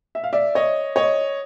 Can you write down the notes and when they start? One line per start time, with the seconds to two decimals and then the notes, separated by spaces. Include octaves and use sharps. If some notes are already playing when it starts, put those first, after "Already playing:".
0.15 E5
0.24 F5
0.33 D5 E5
0.55 C#5 D#5
0.96 C#5 D#5